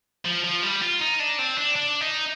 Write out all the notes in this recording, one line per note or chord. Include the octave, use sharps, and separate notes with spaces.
F3
F3
G3
F4
D#4
D4
C4
D4
D4
D#4